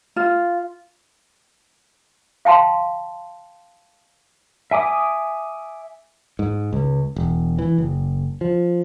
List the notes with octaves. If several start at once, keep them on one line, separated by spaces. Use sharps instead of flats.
F4
F5 G5 A5 C6
E5 G#5 D6 D#6
G#2
C#2
E1
E3
F#1
F3